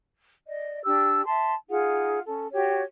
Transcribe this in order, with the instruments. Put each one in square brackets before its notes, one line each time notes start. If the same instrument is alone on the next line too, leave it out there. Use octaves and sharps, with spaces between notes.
[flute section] D5 D#5
D4 G4 E6
E5 A5 C6
D#4 F4 G#4 F#5
C#4 A4
F#4 G4 C#5